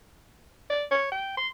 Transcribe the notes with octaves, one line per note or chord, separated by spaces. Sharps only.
D5
C#5
G5
C6